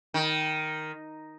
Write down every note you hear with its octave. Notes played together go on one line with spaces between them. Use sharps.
D#3